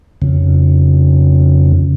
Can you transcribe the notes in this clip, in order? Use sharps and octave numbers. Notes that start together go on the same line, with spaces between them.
F2 C#3